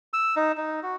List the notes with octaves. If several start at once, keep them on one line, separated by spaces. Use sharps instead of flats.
E6
D#4
D#4
F#4